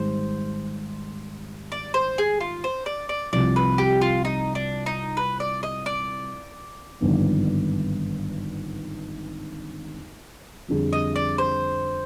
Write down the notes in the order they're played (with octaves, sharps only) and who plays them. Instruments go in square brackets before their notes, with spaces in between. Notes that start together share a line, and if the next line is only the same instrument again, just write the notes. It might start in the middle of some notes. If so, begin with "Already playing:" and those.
Already playing: [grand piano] G#1 G#2 G3 [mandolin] C5
[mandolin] D5
C5
G#4
F4
C5
D5
D5
[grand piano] C2 C3 F3 [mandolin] D5
[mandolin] B4
G4
F4
D#4
D4
D#4
B4
D5
D#5
D5
[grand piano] G#1 G2 D3 F3 B3
F2 D3 G3 D4 G#4
[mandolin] D#5
D5
C5